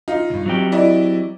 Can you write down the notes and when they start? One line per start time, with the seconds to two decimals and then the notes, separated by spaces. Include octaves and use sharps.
0.08 D#4 F4
0.30 C#2 G2
0.46 F#3 C4 G4
0.72 E4 D5 D#5